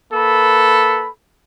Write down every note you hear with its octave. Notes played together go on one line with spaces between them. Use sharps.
A#3 A4 B4 B5